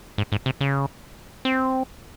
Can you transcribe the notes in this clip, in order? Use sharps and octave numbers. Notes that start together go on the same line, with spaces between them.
G#2
G#2
C3
C#3
C4